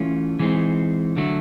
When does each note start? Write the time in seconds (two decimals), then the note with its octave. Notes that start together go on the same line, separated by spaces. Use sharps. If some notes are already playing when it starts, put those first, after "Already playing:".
Already playing: E3 A3 C#4 F4
0.39 E3 G#3 C4 D#4
1.16 D3 F#3 A3